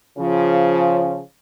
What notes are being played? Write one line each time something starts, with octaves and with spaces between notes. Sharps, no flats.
C#3 F3